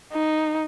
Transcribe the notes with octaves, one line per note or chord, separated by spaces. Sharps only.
D#4